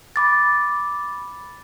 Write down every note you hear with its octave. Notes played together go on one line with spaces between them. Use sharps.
B5 D6 A6